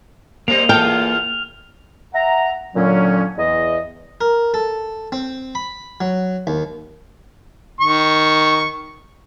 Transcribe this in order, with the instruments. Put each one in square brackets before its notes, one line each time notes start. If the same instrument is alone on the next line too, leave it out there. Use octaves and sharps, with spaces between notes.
[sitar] G3 C4 [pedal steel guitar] A#3 D#5 [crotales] F7
[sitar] E2 F4 A4 [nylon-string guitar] G5 [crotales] F6
[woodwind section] E5 F#5 A#5
A#2 D3 F#3 C#4
E2 D#5
[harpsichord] A#4
A4
C4
B5
F#3
D#2
[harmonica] D#3 C#6